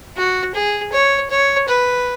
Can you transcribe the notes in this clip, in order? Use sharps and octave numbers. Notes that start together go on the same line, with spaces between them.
F#4
G#4
C#5
C#5
B4